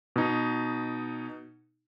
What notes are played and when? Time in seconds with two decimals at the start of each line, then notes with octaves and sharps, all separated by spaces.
0.16 B2 D#4